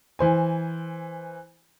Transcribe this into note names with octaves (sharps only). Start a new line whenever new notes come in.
E3 C5 G#5